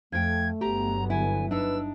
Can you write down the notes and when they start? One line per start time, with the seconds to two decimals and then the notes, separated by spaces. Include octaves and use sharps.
0.12 F2 A3 G5 G#6
0.61 G1 F#3 B3 G4 A#5
1.10 D3 E4 G#5
1.51 D4 D#4 B4 E6